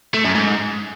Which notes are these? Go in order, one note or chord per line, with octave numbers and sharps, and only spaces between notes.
A3
F#2
G#2